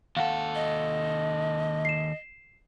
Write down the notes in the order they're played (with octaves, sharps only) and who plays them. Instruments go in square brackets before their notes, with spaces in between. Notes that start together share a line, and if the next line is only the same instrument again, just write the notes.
[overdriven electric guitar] D#2 A4 [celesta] F5 F#5
[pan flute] D#5
[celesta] C7 E7